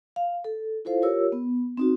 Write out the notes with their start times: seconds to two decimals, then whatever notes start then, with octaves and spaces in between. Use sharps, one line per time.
0.16 F5
0.44 A4
0.85 E4 F4 A4 C5 F5
1.02 F4 G4 A#4 C#5 E6
1.32 B3
1.77 C4 D#4 F#4